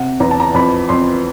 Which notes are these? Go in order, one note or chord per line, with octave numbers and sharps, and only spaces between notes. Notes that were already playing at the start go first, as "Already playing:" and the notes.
Already playing: C3 F#5
E2 A#5
A5
A#5
F2 B5
F2 C6